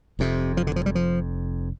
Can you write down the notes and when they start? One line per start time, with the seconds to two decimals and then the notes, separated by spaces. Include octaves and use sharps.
0.19 F1 F2 C3
0.57 F3
0.67 D3
0.76 F3
0.86 G3
0.95 F3